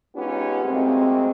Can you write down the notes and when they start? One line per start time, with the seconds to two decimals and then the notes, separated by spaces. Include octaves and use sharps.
0.16 G#3 B3 C#4 D#4 F4 G4
0.64 D2 G#3 A#3 C4